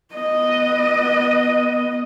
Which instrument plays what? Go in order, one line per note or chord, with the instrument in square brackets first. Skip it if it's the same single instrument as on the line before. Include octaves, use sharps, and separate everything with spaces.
[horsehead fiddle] B3 D#5